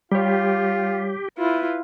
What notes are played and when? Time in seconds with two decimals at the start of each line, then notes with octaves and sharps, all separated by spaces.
0.12 G3 F4 G4 C#5
1.38 E4 F4 B4